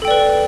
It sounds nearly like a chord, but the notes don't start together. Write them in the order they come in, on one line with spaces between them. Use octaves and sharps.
A4 G5 D5 B4